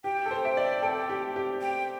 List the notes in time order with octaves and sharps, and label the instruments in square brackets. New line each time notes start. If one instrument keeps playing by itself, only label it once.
[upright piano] G4 [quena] G5
[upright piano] A4
C5
E5
D5
A4
G4
G4
[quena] G5